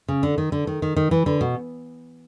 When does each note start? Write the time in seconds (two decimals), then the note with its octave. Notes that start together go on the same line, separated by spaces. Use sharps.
0.08 C#3
0.23 D3
0.38 D#3
0.52 D3
0.67 D#3
0.82 D#3
0.96 D#3
1.11 E3
1.26 D3
1.41 B2